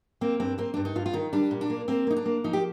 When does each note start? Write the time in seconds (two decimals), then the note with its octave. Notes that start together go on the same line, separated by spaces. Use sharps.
0.21 A#3 C4
0.40 G2 C4
0.58 A#3 C4
0.74 G2 D4
0.85 D#4
0.95 G2 F4
1.06 F4
1.13 D#3 D#4
1.33 G3 D4
1.51 A#2
1.61 D4
1.70 A#3
1.88 A#3 C4
2.07 A#3 D#4
2.16 D4
2.26 A#3
2.44 F3 D#4
2.53 G4